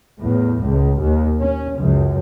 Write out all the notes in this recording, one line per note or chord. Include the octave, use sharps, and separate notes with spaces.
E2 A2
C#2
D#2
C#4
C#2 F#2